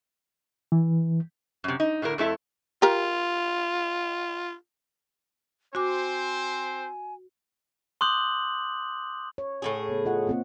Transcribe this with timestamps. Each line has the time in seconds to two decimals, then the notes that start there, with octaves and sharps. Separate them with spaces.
0.72 E3
1.64 F#2 C3
1.80 D#4
2.02 A2 D3 E4 A#4
2.18 F2 A3 E4 A4
2.82 F4 G4 A#4
5.75 C4 F#4 C5 G#5 D6
8.01 C6 D6 D#6 F#6 G6 F#7
9.38 C#5
9.62 A2 C3 G#4
9.88 C#3 B3
10.05 F4 D#5 F#5
10.27 A#3 C4 F4